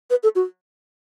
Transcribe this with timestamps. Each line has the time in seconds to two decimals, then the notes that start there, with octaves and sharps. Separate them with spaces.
0.10 B4
0.23 A4
0.36 F#4